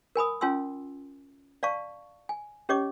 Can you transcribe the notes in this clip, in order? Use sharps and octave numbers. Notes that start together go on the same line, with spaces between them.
A#4 G#5 B5 D#6
C#4 F4 G#5 C6 E6
D5 F5 A5 C#6
G#5
C#4 G4 C#5 D#5 D6